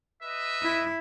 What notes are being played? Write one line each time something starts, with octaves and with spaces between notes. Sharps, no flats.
B4 D#5 E5
E4